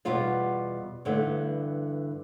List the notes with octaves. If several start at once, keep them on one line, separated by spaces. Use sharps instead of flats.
E2 B2 G3 F4 D5
G2 D3 E3 A3